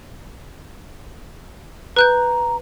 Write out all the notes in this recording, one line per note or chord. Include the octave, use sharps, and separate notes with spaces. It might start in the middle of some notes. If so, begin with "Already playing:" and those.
B4 A#5 F#6 G6